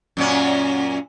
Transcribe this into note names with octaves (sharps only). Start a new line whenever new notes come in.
F#2 A#2 C#4